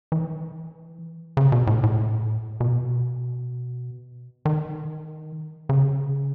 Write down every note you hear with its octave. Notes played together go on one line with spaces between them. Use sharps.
E3
C#3
B2
A2
A2
B2
D#3
C#3